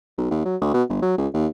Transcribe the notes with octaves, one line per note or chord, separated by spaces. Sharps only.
B1
D#2
F#3
D2
B2
G1
F#3
C#2
D#2